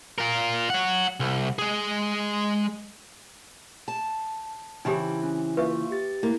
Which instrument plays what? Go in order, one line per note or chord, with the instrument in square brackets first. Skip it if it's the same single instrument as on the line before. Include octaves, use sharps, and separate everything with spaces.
[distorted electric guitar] F4 A#4
C#5 F#5
C2
G#3 G#4
[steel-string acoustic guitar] A5
[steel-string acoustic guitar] C#3 E3 C4 [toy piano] D#4 G4 G#4 [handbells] G5 B5
[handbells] C#4
[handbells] A#3 F4 C#6 [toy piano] B4 E5
[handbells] G4 A6
[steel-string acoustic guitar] A#3 [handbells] E4